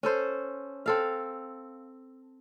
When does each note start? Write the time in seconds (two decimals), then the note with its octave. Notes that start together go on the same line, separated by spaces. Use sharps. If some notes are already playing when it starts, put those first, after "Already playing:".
0.03 C#4 A4 C5
0.86 C4 A4 F5